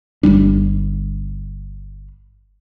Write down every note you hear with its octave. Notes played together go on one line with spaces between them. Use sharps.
G1 G#2 G3 D4